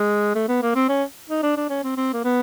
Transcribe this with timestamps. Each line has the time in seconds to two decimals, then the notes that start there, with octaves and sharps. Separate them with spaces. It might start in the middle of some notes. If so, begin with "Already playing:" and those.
Already playing: G#3
0.35 A3
0.48 B3
0.62 A#3
0.75 C4
0.89 C#4
1.30 D#4
1.43 D4
1.57 D4
1.70 C#4
1.83 C4
1.97 C4
2.13 A#3
2.25 B3